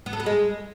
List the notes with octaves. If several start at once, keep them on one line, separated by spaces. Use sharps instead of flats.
B3
A4
B3
G#3